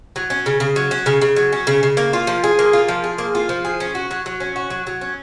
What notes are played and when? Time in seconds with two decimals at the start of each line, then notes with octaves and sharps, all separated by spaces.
0.16 F#3
0.30 C#4
0.46 C#3
0.60 C#3
0.76 F#3
0.91 C#4
1.06 C#3
1.21 C#3
1.36 F#3
1.53 C#4
1.67 C#3
1.83 C#3
1.97 A#3
2.13 F4
2.27 F3
2.44 G#4
2.59 A#3
2.73 F4
2.88 F3
3.04 G#4
3.18 A#3
3.35 F4
3.49 F3
3.65 G#4
3.80 C#4
3.95 F#4
4.11 F#3
4.26 F#3
4.40 C#4
4.56 F#4
4.70 F#3
4.87 F#3
5.01 C#4